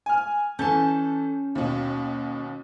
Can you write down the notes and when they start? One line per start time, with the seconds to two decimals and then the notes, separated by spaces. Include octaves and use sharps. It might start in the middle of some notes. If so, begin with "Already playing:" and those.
0.06 G#5 F6
0.59 E3 C#4 A4 A5 G6
1.55 D#2 B2